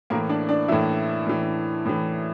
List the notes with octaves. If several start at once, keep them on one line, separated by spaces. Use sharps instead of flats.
A2 E3 A#3 A#4
D4 D5
D4 D5
A2 E3 E4 E5
A2 E3
A2 E3